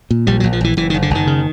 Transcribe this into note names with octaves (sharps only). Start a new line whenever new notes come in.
A#2
A#1 G3
A#1 F#3
F3
A#1 E3
F#1 E3
D#3
F#1
D3
F#1 D#3
C#3